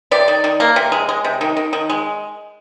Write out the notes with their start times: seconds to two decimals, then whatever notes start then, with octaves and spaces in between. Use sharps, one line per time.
0.11 C3 D5
0.28 D#3
0.44 D#3
0.60 A#3
0.76 C3
0.92 G#3
1.09 G#3
1.24 C3
1.41 D#3
1.57 D#3
1.73 D#3
1.90 G#3